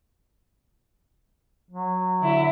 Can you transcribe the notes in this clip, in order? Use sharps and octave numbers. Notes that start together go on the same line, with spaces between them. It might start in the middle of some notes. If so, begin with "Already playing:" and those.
F#3
D3 E4 E5